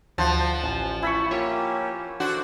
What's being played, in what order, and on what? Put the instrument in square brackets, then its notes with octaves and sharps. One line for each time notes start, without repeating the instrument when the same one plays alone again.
[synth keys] D2 [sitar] F3 [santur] C5 F#5 A5
[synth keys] A1 G#5
[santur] E4 B5 C#6
[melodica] A#3 C#4 G4 [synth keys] F4 C#5
[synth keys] D4 A4 [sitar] F#4 [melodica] C5 D5